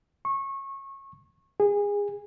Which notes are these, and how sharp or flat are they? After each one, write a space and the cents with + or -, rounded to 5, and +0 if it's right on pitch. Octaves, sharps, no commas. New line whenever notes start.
C#6 -25
G#4 -25